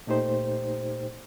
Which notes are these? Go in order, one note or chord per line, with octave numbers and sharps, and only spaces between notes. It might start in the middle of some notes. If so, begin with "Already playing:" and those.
A#2 A3 D#4 G4 C5